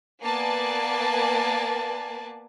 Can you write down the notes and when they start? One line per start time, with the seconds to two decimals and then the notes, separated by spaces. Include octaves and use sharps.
0.22 A#3 B3 B4 D5 G#5 A5